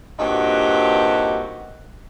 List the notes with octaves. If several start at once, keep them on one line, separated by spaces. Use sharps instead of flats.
G2 A#2 C4 D#4 F#4 G4